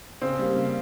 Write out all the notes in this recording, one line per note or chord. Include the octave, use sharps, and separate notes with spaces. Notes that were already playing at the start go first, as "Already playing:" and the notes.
C#3 C4
G3 A#3
C#3